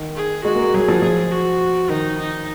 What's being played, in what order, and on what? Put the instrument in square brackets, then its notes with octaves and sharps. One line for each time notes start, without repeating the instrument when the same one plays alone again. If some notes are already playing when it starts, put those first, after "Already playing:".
Already playing: [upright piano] D#3
[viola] G#4
[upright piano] G#3 [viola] F#4
[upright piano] A#3
[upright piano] F#3 [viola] G#4
[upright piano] F3
[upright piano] F3 [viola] G#4
[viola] F#4
[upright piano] D#3 [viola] D#4
[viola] D#4